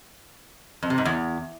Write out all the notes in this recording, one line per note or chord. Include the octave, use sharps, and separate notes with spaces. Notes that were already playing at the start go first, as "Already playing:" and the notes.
F2
C3
G#2
E2